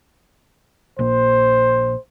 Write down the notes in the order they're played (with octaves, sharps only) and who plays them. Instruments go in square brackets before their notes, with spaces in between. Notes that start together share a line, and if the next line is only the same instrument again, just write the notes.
[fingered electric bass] A#1 A#2 [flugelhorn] C5